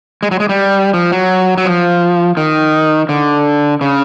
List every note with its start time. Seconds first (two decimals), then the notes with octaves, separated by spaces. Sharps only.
0.23 G#3
0.31 F#3
0.40 G#3
0.49 G3
0.94 F3
1.12 F#3
1.58 F#3
1.65 F3
2.37 D#3
3.09 D3
3.81 C#3